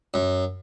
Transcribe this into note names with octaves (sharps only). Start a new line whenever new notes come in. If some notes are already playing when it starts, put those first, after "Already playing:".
F#2